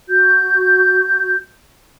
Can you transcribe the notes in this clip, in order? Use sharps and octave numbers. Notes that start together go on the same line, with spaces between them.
F#4 G6